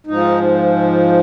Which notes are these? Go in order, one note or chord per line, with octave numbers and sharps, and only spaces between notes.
G#2 F3 D#4